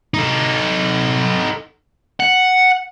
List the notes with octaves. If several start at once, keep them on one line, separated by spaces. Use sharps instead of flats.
D#4 A4
F#5